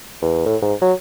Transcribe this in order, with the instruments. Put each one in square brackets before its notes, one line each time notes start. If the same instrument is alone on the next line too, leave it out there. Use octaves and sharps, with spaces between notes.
[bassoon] E2
A2
G#2
F#3